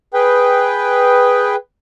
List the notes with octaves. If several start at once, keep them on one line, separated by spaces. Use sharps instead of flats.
G#4 B4 G5